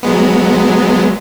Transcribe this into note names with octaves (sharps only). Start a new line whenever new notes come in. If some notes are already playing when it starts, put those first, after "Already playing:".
F#3 G#3 B3